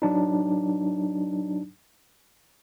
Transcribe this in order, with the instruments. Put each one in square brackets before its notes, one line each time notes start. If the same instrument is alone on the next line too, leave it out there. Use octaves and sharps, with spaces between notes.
[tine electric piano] F#3 D4 D#4